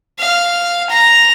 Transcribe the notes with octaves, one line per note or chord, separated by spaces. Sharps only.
F5
A#5